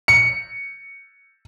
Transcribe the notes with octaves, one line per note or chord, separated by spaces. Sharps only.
C#7